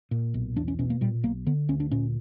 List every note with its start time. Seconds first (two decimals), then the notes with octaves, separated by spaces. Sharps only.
0.11 A#2
0.34 B1
0.56 E2 D4
0.68 C#4
0.79 B2 C#4
0.90 A#3
1.01 A#2 G3
1.23 B1 A#3
1.46 D3 B3
1.69 D2 C#4
1.80 D4
1.91 A#2 C#4